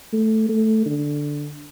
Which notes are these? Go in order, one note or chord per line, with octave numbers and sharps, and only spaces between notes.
A3
A3
D3